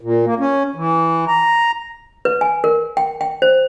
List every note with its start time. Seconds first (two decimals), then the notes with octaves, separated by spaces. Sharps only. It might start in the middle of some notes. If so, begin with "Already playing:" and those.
0.01 A#2
0.25 A#3
0.39 C#4
0.76 E3
1.28 A#5
2.25 B4
2.41 G#5
2.64 A#4
2.97 G5
3.21 G5
3.42 C5